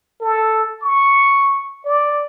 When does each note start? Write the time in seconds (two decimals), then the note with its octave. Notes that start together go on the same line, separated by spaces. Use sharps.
0.21 A4
0.82 C#6
1.85 D5